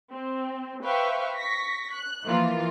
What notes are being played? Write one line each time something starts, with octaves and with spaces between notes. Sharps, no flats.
C4
B4 C5 E5 F5 G5 C#6
C#6 A#6 B6
F#6
E3 F3 A#3 F4